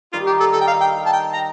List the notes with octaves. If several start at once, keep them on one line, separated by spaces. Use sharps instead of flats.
D#3 G3 F4
G4
A4
D#3 A4
G5
F5
G5
A5
G5
A#5